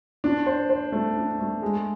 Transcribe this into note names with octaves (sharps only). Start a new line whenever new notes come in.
D4
C5
C5
A3
D4
A3
G#3